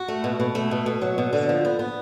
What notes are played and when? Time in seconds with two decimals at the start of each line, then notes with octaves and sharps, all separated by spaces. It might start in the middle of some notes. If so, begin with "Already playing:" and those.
Already playing: F#4
0.08 A3
0.24 B2
0.40 B2
0.55 A3
0.71 B2
0.86 B2
1.02 F#3
1.18 B2
1.33 D3
1.49 F3
1.65 B3
1.79 B3